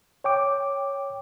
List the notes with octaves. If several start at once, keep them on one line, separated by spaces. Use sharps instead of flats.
C#5 G5 D6